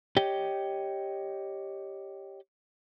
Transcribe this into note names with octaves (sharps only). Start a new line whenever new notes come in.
G4 C#5 D#5 G5